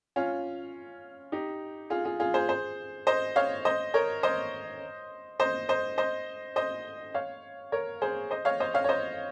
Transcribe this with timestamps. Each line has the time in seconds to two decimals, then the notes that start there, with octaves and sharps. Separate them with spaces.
0.16 C#4 F4
1.32 D#4 G4
1.90 F4 G#4
2.05 F4 G#4
2.20 F4 G#4
2.34 G#4 C5
2.49 G#4 C5
3.07 C5 D#5
3.36 C#5 F5
3.65 C5 D#5
3.94 A#4 C#5
4.23 C5 D#5
5.40 C5 D#5
5.69 C5 D#5
5.98 C5 D#5
6.56 C5 D#5
7.14 C#5 F5
7.72 A#4 C#5
8.02 G#4 C5
8.31 C5 D#5
8.45 C#5 F5
8.60 C5 D#5
8.74 C#5 F5
8.84 C#5
8.89 C5 D#5